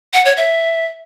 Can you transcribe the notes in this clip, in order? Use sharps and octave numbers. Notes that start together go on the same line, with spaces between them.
F#5
C#5
E5